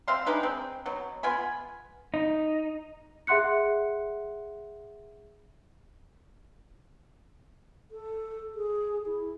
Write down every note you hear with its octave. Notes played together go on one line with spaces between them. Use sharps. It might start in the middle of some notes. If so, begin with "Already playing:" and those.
C4 E5 F5 C6
G#3 D4 D#4 B4
C4
B2 F#3
B3 F4 G#5 B5
D#4
G#4 E5 F#5 C6 F#6 C#7
A4
G#4
E4